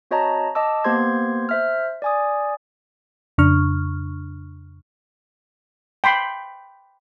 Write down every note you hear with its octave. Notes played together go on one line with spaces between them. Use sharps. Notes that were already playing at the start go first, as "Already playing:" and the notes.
C4 F#4 C#5 D#5 A5 A#5
D#5 A5 D6 E6
A#3 B3 G4 C5 C6 G#6
C5 E5 F6
D5 G#5 D#6
F2 C#3 D4 C#6 F6
G5 B5 C6